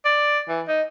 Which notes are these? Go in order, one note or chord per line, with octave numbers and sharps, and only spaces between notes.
D5
E3
D#4